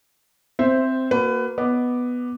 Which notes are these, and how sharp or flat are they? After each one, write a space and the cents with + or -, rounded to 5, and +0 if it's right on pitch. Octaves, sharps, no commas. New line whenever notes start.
C4 -5 C5 +5 E5 +0
A#3 +0 F#4 +0 B4 +25
B3 +0 D#5 +0 D6 +5